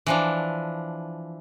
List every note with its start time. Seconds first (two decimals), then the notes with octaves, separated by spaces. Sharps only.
0.06 E3 F3 D4